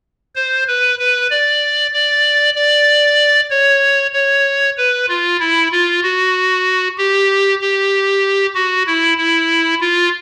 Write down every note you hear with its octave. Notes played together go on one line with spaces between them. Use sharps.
C5
B4
B4
D5
D5
D5
C#5
C#5
B4
F4
E4
F4
F#4
G4
G4
F#4
E4
E4
F4